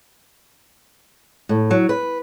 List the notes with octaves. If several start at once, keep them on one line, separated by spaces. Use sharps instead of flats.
A2
F#3
B4